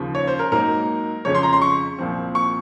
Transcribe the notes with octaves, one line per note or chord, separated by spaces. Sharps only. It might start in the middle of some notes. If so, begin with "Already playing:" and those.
Already playing: D#2 C#3 F3
C#5
C5
A#4
G#2 F#3 A#3 D#4 A#4
F2 C#3 G#3 C#4 C#5
C6
A#5
C6
C#6
C2 A#2 F3 C4
C#6